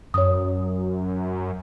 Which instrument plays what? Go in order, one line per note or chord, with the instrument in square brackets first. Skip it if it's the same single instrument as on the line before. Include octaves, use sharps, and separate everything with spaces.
[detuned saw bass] F#2 [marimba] C#5 D#6